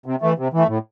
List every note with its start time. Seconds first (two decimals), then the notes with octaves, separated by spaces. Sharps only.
0.06 C3
0.22 E3 A3
0.38 C3
0.54 E3 A3
0.68 A2